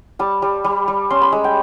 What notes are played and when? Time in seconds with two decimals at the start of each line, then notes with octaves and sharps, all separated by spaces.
0.19 G3 A5
0.42 G3
0.64 G3
0.88 G3
1.10 C#4 C6
1.22 B5
1.32 G#3
1.44 G5